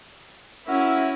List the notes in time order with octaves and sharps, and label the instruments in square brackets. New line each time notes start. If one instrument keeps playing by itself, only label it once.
[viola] C#4 E4 [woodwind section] F#4 A#4 E5